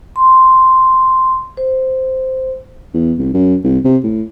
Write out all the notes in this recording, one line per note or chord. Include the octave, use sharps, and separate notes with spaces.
C6
C5
E2
C2
F#2
C2
C3
A2